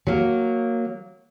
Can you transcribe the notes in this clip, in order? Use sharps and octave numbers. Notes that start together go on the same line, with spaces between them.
F#3 A#3